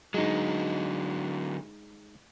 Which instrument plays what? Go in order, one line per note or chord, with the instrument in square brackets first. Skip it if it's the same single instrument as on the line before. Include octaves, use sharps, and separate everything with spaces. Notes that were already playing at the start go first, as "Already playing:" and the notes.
[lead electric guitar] D3 F#3 [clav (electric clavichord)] G#3 D#4